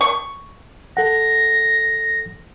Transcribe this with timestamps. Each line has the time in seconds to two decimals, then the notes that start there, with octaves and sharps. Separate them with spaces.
0.01 C#6
0.97 A4 F#5 A#6